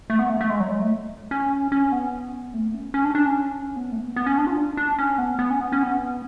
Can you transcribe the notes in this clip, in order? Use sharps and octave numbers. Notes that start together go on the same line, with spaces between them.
A3
B3
A3
A3
G#3
F#3
G#3
A3
C#4
C#4
B3
A3
C#4
C#4
D4
D4
C#4
B3
A3
B3
B3
C#4
D4
F4
D4
D4
C#4
B3
B3
C#4
B3
C#4
B3